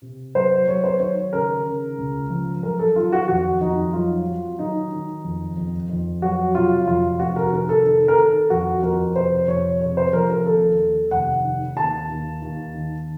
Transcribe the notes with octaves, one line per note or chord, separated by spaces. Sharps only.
C3
F#3 C5
F#3 C#5
C5
D#3 C#5
C#3 A#4
C#3
C#2
F3
F#3 A#4
A4
D#3 F4
F#4
F2 F#4
F2 D#4
F#3 F4
F#3
D#3 D#4
D#3
F2
F2
F2
F#3 F#4
C3 F4
F2 F4
F1 F#4
A#4
D#3 A#4
A4
D#3 A4
A#4
D#3 A4
F2 F#4
F2 A#4
C3 C5
F2 C#5
C3 C#5
C5
F3 A#4
A#4
D#2 A4
D#2
F1 F#5
D#3
D#2 A5
D#2
D#2
D#3